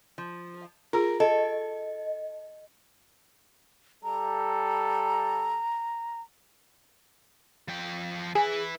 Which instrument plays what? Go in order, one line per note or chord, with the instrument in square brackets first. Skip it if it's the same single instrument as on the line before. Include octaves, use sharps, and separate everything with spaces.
[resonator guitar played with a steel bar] F3
[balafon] F4 G#4 [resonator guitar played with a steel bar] A#4
[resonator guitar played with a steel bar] A4 [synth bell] D#5
[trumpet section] G3 A4 [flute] A#5
[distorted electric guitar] F3 G5
[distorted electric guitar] E4 B4 [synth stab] G#4